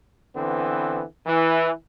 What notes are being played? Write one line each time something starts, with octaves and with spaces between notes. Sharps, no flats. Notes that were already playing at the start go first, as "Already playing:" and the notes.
D3 E3 B3 C4
E3